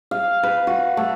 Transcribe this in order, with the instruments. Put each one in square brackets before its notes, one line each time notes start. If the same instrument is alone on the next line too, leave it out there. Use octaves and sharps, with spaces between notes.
[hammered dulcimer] F5
B4
F#4
A3